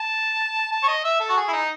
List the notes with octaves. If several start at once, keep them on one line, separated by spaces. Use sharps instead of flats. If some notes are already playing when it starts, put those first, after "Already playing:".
Already playing: A5
A5
C#5
D#5
E5
A4
F#4
G#4
E4
D#4